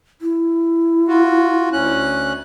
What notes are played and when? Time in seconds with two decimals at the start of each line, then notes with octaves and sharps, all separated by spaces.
0.21 E4
1.08 F4 F#4
1.73 D2 C#4 F#6